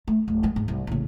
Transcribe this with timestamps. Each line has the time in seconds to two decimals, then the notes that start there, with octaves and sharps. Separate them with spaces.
0.08 A3
0.28 D1
0.43 F3 G#3
0.56 G#2
0.68 C2
0.87 A1 C#3